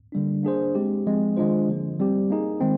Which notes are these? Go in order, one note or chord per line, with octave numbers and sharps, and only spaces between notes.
D3 G3 A#3 D4
A#3 D4 G#4 C5
G#3 C4 G4
F3 G#3 C4
D#3 G#3 D4 F4 C5
D3 F3 A#3
G3 C4 G4
A#3 D#4 G#4
D#3 G#3 C4